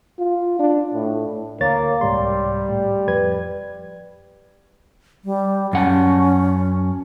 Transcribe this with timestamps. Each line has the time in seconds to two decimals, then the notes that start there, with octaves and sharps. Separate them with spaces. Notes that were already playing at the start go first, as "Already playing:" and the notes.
0.19 F4
0.59 D4
0.94 A2
1.61 D2 A#3 C#5 A6
2.01 C2 G#2 G3 C6
2.69 A2
3.08 F2 B4 G#6
5.25 G3
5.73 F#2 C#4 F#5 A5